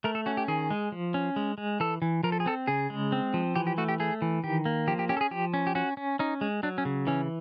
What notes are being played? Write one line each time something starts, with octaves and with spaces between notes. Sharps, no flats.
A3 A#4
A4
C#4 F#4
G4
D#3 G#4
G#3
F3
C#4
G#3
G#3
E3 A4
E3
F3 A#4
A4
G#4
C4 A4
C#3 G#4
G#3
C4
F3
E3 G4
G4
A3 F#4
G4
A3 G#4
E3
D#3 G4
A#3
F3 G4
G4
C#4 G4
A4
G#4
F3 G4
C#4
G4
C#4 F#4
C#4
C#4 D#4
G#3
F#3 D4
C#4
C#3
E3 C#4